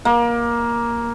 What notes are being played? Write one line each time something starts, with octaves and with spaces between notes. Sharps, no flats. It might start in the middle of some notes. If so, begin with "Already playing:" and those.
A#3